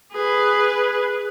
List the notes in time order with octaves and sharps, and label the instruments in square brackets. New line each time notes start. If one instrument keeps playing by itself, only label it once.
[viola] G#4 B4